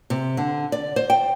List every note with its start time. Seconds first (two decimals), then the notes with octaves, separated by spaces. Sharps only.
0.10 C3
0.37 D3
0.72 D5
0.96 C5
1.10 G5